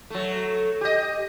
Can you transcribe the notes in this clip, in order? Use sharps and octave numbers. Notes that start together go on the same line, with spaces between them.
F#3 A3
G4 D#5